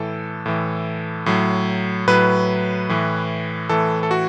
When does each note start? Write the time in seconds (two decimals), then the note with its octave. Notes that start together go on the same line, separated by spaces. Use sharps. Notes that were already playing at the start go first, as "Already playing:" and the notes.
Already playing: A2 E3 A4
0.46 A2 E3
1.26 A2 F#3
2.08 A2 F#3 B4
2.89 A2 E3
3.69 A2 E3 A4
4.03 A4
4.11 F#4